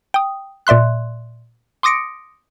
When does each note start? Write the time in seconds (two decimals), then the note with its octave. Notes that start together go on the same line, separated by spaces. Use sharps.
0.14 G5 D#6
0.67 A#2 D5 E5 C6 F#6
1.83 C6 D6 D#6 A#6 C#7 D7